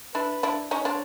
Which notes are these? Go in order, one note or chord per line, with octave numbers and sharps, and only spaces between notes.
D4 E4 B4
D4 E4
C#4 D#4 C#5
C4 D4